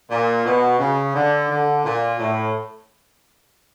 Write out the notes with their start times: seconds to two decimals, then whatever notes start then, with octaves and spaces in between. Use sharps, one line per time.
0.10 A#2
0.45 B2
0.79 C#3
1.14 D3
1.50 D3
1.84 A#2
2.19 A2